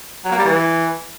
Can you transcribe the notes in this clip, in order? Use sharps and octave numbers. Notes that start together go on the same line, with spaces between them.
F#3
A#3
G3
E3